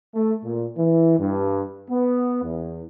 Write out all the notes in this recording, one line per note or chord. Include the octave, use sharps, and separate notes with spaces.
A3
A#2
E3
G2
B3
E2